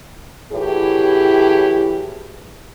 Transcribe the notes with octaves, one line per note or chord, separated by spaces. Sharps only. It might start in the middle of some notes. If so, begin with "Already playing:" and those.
A2 E3 F#3 E4 G4 G#4